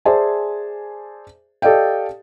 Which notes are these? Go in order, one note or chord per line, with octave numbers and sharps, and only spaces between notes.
G#4 C5 D5 E5 G#5 A5
G4 A4 D5 D#5 F5 G5